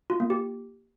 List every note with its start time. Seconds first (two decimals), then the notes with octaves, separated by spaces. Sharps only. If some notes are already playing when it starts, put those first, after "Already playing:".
0.10 F4
0.20 A#3
0.30 G4